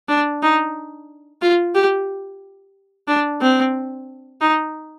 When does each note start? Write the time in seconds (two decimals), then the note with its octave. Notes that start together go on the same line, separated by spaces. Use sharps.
0.09 D4
0.43 D#4
1.42 F4
1.75 G4
3.08 D4
3.41 C4
4.41 D#4